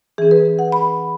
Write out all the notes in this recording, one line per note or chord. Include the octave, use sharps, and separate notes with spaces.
E3 C#4 G#4
B4
F#5
B5